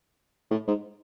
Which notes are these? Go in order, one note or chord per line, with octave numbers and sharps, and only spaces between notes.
A2
G#2